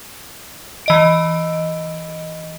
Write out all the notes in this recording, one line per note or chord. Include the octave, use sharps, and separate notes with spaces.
E3 D#5 D7